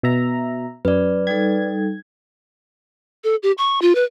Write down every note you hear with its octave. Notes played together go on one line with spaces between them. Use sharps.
B2 E5 A#5
F#2 B4 D5
G3 D#4 A4 G#6
A4
G4
C#6
F4
B4